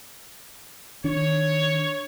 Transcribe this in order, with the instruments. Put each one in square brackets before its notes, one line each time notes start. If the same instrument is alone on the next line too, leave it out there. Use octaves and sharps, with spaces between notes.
[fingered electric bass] D#3 D4 [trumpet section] C#5